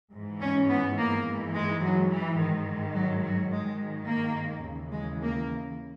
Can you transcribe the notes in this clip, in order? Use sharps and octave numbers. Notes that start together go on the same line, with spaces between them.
G#2 E3
C#4
B3
A#3
G#2 E3
G#3
F#3
E3
G#2 D#3
F#3
F#3
G#2 D#3 G#3
A#3
D#2 C#3 E3
G#3
A#3